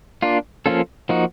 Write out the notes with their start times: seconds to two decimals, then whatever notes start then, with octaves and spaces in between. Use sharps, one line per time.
0.22 A#3 D4 F4
0.66 F3 A#3 C#4 F4 A4
1.09 F3 A#3 D#4 F#4